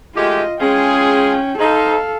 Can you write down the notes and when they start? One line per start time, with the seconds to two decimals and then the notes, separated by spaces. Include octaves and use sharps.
0.15 G#3 A3 F4 G4 D#5
0.60 G#3 C#4 F4 G#4 G5
1.59 D#4 A4 C5 F5